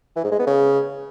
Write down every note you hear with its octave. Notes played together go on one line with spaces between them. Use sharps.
E3
G#2
G#3
B3
C#3